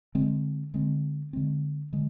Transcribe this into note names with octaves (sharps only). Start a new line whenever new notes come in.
D3 G#3 C4
D3 G#3 C4
D3 G#3 C4
D3 G#3